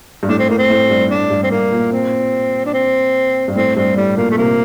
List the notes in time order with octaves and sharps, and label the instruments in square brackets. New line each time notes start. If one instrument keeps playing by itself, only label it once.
[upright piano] G2
[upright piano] A2 [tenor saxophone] D4
[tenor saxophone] C4
[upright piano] A2 [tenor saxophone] A#3
[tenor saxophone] C4
[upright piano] A2
G2
[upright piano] A2 [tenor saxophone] D4
[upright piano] G2
[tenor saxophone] C4
[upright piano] G2 [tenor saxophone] A#3
[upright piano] A#2
[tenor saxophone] C4
D4
C4
[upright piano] G2
[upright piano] A2 [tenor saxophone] C4
[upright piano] G2 [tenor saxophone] C4
[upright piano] A2 [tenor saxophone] G3
[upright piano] A#2 [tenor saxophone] A#3
[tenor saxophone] A3
[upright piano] C3 [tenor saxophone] A#3